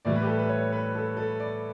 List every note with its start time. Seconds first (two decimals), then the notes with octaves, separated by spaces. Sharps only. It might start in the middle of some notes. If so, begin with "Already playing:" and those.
0.05 A2 E3 G3 D5
0.16 B4
0.22 G4
0.27 A4
0.39 B4
0.49 C#5
0.73 B4
0.95 A4
1.17 A4
1.40 D5